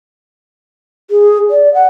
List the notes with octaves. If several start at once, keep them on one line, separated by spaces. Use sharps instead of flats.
G#4
D5
F#5